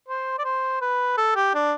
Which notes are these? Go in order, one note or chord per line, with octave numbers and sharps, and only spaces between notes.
C5
D5
C5
B4
A4
G4
D4